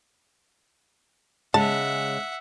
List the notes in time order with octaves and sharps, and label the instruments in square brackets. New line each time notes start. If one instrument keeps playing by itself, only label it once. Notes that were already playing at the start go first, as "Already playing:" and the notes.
[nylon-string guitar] C#3 G#3 [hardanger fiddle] E5 F#5 [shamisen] A5